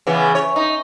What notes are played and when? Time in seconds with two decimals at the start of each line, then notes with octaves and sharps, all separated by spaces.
0.07 C#3 E3 B3
0.35 C#5
0.56 D#4